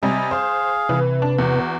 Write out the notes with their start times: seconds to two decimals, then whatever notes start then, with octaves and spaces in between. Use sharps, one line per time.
0.03 C3 G3 D#5 G#5
0.31 G#4 C5 F5
0.89 C3 E3 B4
1.22 D4
1.38 E2 F#4